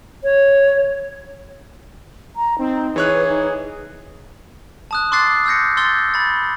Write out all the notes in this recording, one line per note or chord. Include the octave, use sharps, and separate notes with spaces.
C#5
A#5
C4 D#4
E3 G#4 C#5 F#6
B4
D#4
A5 D#6 F#6
C6 D6 E6 F#6 A6 C7
E6 F#6 G6 A#6 C#7
C6 E6 G6 A6 G7
B5 A6